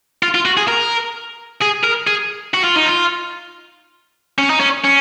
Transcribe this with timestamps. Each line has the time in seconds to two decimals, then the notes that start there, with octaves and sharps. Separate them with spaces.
0.23 F4
0.34 F4
0.46 F#4
0.57 G#4
0.68 A#4
1.62 G#4
1.84 A#4
2.07 G#4
2.54 F#4
2.64 F4
2.76 D#4
2.86 F4
4.38 C#4
4.50 D#4
4.60 C#4
4.84 C#4